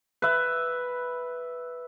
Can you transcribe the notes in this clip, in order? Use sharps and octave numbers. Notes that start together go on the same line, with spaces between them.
B4 E5